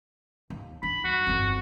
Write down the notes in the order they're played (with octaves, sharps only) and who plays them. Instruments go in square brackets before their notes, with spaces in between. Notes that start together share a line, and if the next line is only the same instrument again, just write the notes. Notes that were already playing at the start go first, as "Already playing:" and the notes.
[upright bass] D#2
[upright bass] D4 [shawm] B5
[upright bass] G2 [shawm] F#4
[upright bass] G1 F2